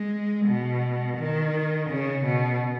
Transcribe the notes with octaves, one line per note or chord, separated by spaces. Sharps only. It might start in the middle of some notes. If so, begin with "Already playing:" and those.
Already playing: G#3
B2
D#3
C#3
B2